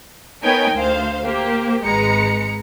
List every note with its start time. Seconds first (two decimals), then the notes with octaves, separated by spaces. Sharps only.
0.43 B3 D#4 A#4 C#5 G5 G#5
0.73 D2 C5 F5
1.25 A#3 G4 C5
1.83 G#1 G#3 B4 A#5 C#7